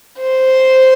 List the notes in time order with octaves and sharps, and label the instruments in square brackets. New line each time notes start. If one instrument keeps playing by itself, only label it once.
[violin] C5